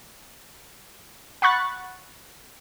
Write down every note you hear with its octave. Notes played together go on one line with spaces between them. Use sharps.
F#5 B5 C#6 F#6 A6